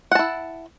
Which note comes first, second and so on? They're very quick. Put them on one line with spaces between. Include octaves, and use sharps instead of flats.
F#5 A5 E4